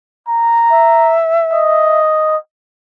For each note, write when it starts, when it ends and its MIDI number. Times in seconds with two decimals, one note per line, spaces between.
0.29 1.14 82
0.71 2.00 76
1.53 2.37 75